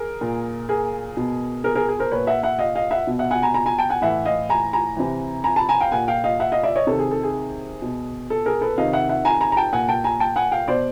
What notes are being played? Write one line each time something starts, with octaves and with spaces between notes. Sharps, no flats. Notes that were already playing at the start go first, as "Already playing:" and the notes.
Already playing: G#4 A#4
A#2
G#4 A#4
B2
G#4 A#4
G#4 A#4
G#4
A#4 C5
A#2 B4 C#5
E5 F#5
E5 F#5
D#5 F5
D#5 F5
E5 F#5
B2
E5 F#5
F#5 G#5
G#5 A#5
G#5 A#5
G#5 A#5
G5 A5
F#5 G#5
A2 E3 E5 F#5
D#5 F5
G#5 A#5
G#5 A#5
C3 E3
G#5 A#5
A5 B5
G#5 A#5
F5 G5
A#2 F#5 G#5
F5 G5
D#5 F5
E5 F#5
D#5 F5
D5 E5
C#5 D#5
C3 D#3 A4
G#4
A4
G#4
B2
A4
G#4 A#4
A4 B4
C3 D#3 D#5 F5
E5 F#5
E5 F#5
G#5 A#5
G#5 A#5
A#5
G5 A5
A#2 F#5 G#5
G5 A5
G#5 A#5
G5 A5
F#5 G#5
F5 G5
B2 C5 D5